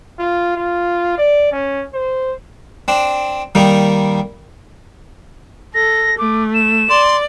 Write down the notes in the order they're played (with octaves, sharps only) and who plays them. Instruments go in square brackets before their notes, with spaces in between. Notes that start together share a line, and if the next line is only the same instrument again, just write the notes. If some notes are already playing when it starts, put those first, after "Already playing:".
[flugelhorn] F4
F4
D5
C#4
C5
[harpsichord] C4 D4
D#3 G3 A#3 D#4
[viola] A4 [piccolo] A#6
[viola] A3 [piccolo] D6
[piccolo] E7
[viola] D5 [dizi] C6